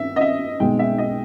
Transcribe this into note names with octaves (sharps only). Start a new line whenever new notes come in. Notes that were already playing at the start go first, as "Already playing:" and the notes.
Already playing: E5
D#5
E5
B1 B2 G#3 G5
E5
D#5